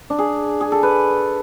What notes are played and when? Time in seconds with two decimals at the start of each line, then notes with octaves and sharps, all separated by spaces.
0.10 D4
0.19 G#4
0.61 G#4
0.72 A4
0.83 B4